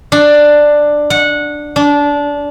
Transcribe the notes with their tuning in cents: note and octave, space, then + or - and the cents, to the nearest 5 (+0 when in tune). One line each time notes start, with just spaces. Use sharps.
D4 +10
F#5 -15
D4 -20